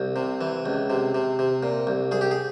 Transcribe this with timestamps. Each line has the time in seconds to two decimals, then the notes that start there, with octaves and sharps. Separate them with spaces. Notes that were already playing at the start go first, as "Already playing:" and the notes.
Already playing: C2
0.16 C3
0.41 E3
0.66 C#2
0.90 C3
1.15 C3
1.39 C3
1.63 A#2
1.87 C2
2.11 C2 G#4
2.21 G4
2.31 G#4